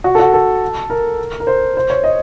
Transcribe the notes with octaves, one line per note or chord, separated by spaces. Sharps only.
F#4
A4
F#4
A4
A#4
A#4
C5
C5
C#5
D#5